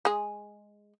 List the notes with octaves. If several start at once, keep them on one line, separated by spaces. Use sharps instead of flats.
G#3 G#4